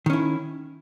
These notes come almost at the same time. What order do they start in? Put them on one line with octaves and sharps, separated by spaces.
D#3 C#4 E4